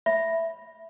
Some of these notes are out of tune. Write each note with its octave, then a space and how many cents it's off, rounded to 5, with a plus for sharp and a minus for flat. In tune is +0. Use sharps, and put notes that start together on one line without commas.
E5 +5 B5 -10